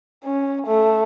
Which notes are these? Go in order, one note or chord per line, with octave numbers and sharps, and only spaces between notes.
C#4
A3